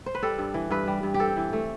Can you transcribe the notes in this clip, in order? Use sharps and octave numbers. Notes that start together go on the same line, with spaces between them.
C5
B4
G3 A4
G2
E3
G2 B4
G3
G2
G4
C4 A4
E3
A3